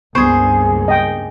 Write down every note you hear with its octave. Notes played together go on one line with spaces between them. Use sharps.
C#2 G2 A#3 B3 G#4 C5 C#6
D#5 G5